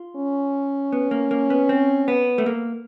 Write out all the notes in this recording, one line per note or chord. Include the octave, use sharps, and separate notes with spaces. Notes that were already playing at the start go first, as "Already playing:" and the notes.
Already playing: F4
C#4
B3
A#3
A#3
B3
C4
B3
A3
A#3